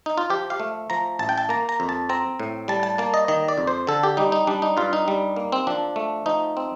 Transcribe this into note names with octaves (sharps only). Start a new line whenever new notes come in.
D#4
F4
F3 G4
F5
A3
F3 A#5
A1 A5
G5
A5
A#3 A#5
A#5
F2
A5
C4 A#5
A2
G3 A5
A5
A#3 A5
D#5
D#3 D#5
D5
F2
C5
D3 A4
G4
G3 D#4
D#4
G3 D4
D#4
G2 F4
D#4
G3
A#3
C4
F3 D4
A3
F3 D#4
C4